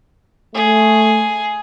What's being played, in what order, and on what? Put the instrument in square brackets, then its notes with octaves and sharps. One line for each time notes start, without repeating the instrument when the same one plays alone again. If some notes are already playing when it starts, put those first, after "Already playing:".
[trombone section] A3 [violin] G#4